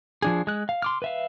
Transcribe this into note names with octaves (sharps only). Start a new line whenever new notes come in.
F3 D4 G#4
G#3 F#6
F5
C6 D6 F6
B4 E5 F5